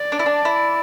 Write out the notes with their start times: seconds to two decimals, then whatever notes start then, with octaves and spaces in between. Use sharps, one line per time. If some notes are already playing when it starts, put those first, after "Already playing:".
Already playing: D5
0.12 D4
0.19 E4
0.26 D4
0.45 E4